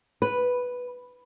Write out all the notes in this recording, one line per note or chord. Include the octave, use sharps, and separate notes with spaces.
B4